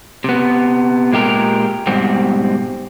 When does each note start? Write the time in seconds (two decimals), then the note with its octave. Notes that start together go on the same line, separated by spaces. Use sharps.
0.24 C3 B3
1.12 A#2 G#3 G4 A#4
1.87 G#2 B2 G3 C4